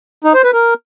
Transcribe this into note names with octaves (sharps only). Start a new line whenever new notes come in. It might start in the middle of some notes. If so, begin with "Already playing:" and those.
D#4
C5
B4
A#4